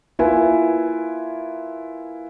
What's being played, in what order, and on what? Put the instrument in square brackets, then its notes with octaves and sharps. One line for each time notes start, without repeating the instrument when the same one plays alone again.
[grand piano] A#3 E4 F4 B4 G#5